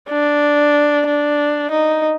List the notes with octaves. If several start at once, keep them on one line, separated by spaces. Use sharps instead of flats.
D4
D4
D#4